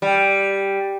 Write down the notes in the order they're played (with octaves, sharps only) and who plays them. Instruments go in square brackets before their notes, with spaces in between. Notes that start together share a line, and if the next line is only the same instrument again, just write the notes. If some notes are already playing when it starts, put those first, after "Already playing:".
[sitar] G3